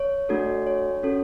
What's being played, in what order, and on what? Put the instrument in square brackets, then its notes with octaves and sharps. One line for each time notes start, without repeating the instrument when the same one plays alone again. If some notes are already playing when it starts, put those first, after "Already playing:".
Already playing: [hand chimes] C#5
A3 D4 F#4 A4
C#5
C#4 F#4 A4